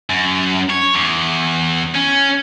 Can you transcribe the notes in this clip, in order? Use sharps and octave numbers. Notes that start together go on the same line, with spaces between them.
F#2
C#5
E2
C#4